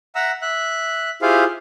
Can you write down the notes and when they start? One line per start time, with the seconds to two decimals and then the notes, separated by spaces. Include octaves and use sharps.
0.15 E5 F#5 A#5 E6
0.42 E5 F#6
1.22 E4 F4 G4 G#4 C5 F5